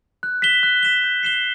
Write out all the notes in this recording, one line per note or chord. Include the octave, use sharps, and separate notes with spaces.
F#6
B6 E7 G7
F#6
B6 E7 G7
G6
C7 E7 G7